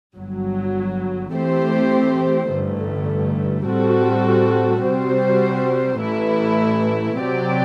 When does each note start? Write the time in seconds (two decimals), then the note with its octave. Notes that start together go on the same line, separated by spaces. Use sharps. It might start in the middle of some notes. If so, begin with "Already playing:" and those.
0.15 G1 G2 F#3
1.32 E3 A3 C4 G4 C5
2.49 A1 G2 D3 A3
3.66 A2 G3 C4 F#4 A4
4.83 C3 G3 C4 F#4 C5
5.99 A1 A2 E3 A3 E4
7.16 C3 F#3 C4 G4 D5